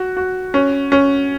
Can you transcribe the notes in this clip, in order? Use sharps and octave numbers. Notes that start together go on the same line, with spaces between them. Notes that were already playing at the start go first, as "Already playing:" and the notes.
Already playing: F#4
F#4
C#4
C#4